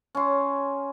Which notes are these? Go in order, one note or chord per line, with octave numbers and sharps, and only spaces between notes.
C#4 C6